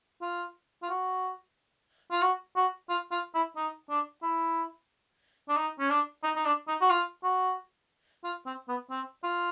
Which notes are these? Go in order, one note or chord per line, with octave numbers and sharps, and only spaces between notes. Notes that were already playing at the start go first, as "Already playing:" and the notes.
F4
F4
F#4
F4
F#4
F#4
F4
F4
E4
D#4
D4
E4
D4
D#4
C#4
D4
D#4
D#4
D4
D#4
F#4
F4
F#4
F4
C4
B3
C4
F4